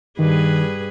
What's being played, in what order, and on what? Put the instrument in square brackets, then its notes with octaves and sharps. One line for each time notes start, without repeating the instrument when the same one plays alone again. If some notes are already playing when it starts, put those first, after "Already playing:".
[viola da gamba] G2 G#4 B4 [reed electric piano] D#3